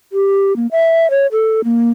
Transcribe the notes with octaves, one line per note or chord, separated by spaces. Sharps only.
G4
A#3
E5
C#5
A4
A#3